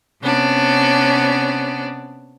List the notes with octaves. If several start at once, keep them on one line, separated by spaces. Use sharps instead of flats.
C3 B3 C#4 D4